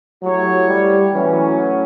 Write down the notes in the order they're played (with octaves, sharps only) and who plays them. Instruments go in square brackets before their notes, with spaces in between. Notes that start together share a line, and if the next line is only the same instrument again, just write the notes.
[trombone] F#3 [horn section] A3 E4 G4 C#5
[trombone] G3
[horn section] A2 F#3 C#4 [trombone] E3